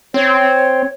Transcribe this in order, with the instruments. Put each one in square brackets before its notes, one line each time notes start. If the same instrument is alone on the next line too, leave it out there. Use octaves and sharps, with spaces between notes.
[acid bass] C4 [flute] C#5